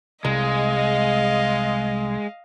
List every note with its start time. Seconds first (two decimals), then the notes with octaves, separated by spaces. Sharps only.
0.25 C2 G#3 D#5 F5